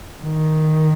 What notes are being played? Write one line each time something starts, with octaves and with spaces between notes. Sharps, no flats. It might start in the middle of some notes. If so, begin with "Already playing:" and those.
D#3